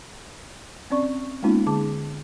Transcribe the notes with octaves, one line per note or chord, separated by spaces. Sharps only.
C4 C#4 D5 C#6
G#3 A#3 B3 C#4 D#4 F4
D3 G#4 A5 D6